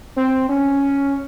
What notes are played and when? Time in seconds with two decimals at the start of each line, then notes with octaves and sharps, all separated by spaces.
0.17 C4
0.49 C#4